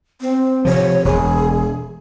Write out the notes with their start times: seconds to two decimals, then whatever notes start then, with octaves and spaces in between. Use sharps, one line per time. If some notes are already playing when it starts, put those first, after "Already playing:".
0.21 C4
0.65 C3 F3 C#5
1.05 E1 G#4